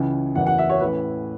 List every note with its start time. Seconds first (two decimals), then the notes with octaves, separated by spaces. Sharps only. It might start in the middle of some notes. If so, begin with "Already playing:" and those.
Already playing: C#2 C#3 E3
0.35 F#1 E2 E3 F#5
0.47 F#5
0.58 E5
0.70 C#5
0.81 A1 A2 E3 B4